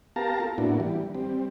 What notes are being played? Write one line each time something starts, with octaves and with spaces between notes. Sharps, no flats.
B3 G4 A#4 F5 A5 A#5
F4 A4 A#4
A2 A#3 B3 D4 E4 F#4
E3 G3
G3 C4